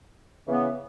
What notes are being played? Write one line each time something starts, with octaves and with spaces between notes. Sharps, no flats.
C#3 E3 B3